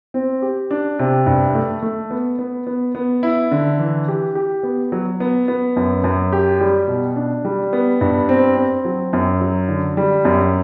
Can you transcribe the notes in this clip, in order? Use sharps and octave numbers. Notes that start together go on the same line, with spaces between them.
C4
G4
D4
C3
G2
A3
A3
B3
B3
B3
B3
E4
D3
E3
G4
G4
B3
F#3
B3
B3
F#2
F#2
G4
G3
B2
D4
G3
B3
G2
C4
C4
F#3
F#2
F#3
D3
G3
F#2